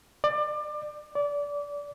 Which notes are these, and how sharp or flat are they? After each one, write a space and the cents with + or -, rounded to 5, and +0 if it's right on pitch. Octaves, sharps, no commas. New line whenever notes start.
D5 +25
D5 -25